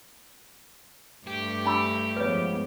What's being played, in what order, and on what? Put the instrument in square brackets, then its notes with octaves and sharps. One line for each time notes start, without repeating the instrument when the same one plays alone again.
[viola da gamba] G2 A3 [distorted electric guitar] G4
[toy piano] D4 B5 E6
[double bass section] F3 G#3 B3 [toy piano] B4 C#5